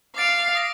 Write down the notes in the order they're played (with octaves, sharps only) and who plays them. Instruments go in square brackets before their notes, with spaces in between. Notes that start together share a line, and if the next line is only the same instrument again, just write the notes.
[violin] F5 [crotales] D6 A6 D7 F7
[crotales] D#6 A#6